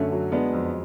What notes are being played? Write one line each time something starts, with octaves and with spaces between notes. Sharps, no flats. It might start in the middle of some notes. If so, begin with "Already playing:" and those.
Already playing: F#2 D3 F#3 A3 C#4
F#3
G#3 B3 D4
F2